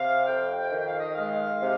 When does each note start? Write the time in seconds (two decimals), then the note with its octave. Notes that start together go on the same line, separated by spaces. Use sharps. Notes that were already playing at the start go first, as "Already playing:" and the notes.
Already playing: C3 F5
0.26 F2 G5
0.56 G5
0.71 D#3
0.87 F5
0.99 D#5
1.14 G#3 F5
1.61 C3